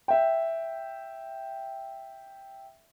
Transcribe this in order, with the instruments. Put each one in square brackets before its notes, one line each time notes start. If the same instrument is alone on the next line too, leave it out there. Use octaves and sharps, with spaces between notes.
[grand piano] E5 G5